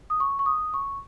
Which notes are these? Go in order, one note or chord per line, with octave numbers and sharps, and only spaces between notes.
D#6
C#6
C#6
D#6
C#6